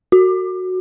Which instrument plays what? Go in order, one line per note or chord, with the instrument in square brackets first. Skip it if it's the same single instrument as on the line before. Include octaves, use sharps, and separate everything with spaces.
[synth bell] F#4